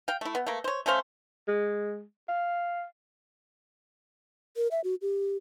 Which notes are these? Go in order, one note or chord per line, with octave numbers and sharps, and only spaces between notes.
F5 G5
A3 E4
B3
A3 A#3
C5 C#5
A3 C#4 C5 F5
G#3
F5
A#4
E5
F#4
G4